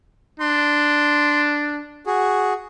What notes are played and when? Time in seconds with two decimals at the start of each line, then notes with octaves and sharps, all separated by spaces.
0.40 D4 C6
2.06 F#4 G#4